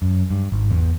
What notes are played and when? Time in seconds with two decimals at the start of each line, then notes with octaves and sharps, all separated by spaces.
0.02 F#2
0.31 G2
0.52 G#1
0.71 E2